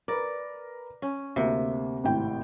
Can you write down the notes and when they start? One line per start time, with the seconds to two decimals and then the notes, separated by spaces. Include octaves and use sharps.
0.08 A#4 B4 D5
1.02 C#4
1.36 D2 C3 A#3
2.04 G#1 A2 G5